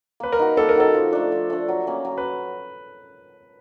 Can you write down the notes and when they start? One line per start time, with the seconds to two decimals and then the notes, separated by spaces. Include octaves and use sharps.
0.20 A#3 B4
0.32 A#4
0.39 D#4 F#4
0.57 A#3 A4
0.69 A#4
0.75 D#4 F#4 A4
0.94 F3
1.13 A3 D4
1.32 F3
1.50 A3 D4
1.68 F#3
1.87 A#3 C#4
2.05 F#3
2.18 B4